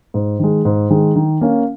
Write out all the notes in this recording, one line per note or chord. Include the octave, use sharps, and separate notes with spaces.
G#2
D#3 G#3
G#2
D#3 G#3
D#3
A#3 C#4